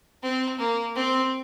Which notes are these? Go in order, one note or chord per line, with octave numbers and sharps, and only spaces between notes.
C4
A#3
C4